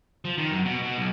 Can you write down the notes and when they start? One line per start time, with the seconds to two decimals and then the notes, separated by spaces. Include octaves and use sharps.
0.25 F3
0.38 D#3
0.51 F#2
0.65 B2
0.82 B2
0.98 B1